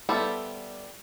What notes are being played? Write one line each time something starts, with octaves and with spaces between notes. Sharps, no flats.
G3 B3 A4 C5 E5